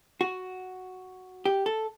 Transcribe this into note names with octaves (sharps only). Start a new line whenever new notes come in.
F#4
G4
A4